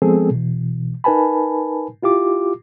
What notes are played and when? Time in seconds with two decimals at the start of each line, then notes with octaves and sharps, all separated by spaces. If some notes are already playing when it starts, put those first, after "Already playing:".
0.02 F3 G#3 B3 C4 G#4 A4
0.31 B2 E3
1.04 D#4 A#4 B4 G#5 A5 B5
2.03 E4 F4 G4 D6